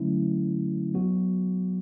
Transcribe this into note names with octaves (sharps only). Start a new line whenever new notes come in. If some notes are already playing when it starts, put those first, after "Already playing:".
Already playing: D3 F#3 A3 C#4 E4
F#3 B3 F#4